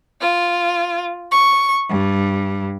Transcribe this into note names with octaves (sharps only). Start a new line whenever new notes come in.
F4
C#6
G2